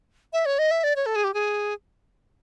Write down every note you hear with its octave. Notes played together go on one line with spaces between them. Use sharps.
E5
C#5
D#5
E5
D5
C#5
A4
G#4
G4
G#4